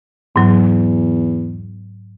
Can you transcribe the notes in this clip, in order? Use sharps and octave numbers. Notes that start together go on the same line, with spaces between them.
E2 G#2 F#3